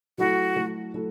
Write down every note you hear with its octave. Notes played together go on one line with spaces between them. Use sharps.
F#3 A3 E4 F#4 A4
F#3 A3 E4 A4
F#3 A3 E4 A4